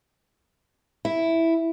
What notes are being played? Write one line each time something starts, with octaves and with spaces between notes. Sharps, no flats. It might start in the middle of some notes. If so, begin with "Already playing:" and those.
E4